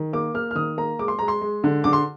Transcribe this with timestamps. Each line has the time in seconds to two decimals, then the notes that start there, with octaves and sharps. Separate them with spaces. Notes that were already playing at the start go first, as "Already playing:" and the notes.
Already playing: D#3
0.13 A#3 D6
0.34 A#3 F6
0.51 F6
0.55 D#3 D#6
0.77 A#3 A#5
0.99 G#3 D6
1.08 C6
1.19 G#3 A#5
1.28 C6
1.41 G#3
1.64 D3
1.84 D3 D6
1.93 C6